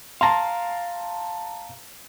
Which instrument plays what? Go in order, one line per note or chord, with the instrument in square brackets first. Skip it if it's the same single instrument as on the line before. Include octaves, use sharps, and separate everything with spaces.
[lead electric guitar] F5 A#5 [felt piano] A5 C6